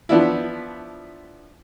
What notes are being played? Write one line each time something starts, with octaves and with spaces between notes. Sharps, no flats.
F3 B3 D4 E4